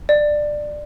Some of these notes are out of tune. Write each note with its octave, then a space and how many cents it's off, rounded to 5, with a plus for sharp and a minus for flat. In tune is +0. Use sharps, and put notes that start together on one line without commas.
D5 +15